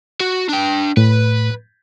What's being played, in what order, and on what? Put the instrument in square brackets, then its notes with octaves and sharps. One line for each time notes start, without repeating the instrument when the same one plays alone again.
[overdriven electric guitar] F#4
D4 G5
[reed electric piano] A2 [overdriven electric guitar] B4